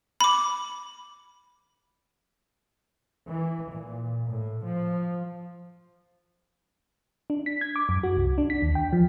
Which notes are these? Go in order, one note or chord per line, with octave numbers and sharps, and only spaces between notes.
B5 D6
E3
A#2
A2
F3
D4
B6
G#6
D6
F#2
F#4
C2
D4
B6
D#2
G5
F3